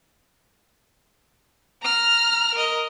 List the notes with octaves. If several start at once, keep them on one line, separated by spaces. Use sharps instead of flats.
A#5 F6
A#4 D#5